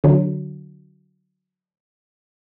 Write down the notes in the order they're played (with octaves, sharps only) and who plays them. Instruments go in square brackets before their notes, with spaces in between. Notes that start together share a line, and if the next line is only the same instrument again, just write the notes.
[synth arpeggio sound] D3 F#3